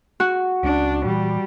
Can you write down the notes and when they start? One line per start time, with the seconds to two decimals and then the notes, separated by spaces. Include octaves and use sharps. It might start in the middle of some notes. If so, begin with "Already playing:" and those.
0.20 F#4
0.63 C#2 G#3 C#4 D4
1.05 A#2 E3 G3